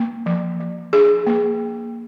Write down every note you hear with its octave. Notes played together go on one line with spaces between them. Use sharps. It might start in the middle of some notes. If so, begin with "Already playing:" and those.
Already playing: A#3
F3
F3
D4 G#4
A#3